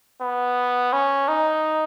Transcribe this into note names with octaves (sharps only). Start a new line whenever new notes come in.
B3
C#4
D#4